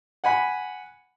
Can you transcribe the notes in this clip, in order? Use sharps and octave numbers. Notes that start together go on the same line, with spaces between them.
F#5 G#5 B5